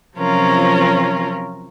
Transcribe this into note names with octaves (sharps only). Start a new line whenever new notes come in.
C3 F3 F#3 C#4 F4 A#4